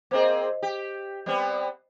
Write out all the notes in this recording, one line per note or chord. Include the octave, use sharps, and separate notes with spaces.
A#3 C4 G#4 C5 D#5
G4
G3 B3 C4